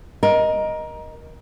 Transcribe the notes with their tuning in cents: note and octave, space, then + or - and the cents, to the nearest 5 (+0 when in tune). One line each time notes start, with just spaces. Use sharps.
A#4 +20 D#5 +0